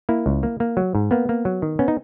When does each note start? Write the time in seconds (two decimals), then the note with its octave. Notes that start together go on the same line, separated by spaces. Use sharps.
0.09 A#3 E4
0.26 C#2
0.43 A#3
0.60 A#3
0.77 F#3
0.95 G#2
1.11 A#3 B3
1.29 A#3
1.45 F#3
1.62 D#3
1.79 B3 C#4
1.88 D#4